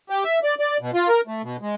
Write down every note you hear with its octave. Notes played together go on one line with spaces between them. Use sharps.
G4
E5
D5
D5
B2
F4
A#4
A3
B2
G#3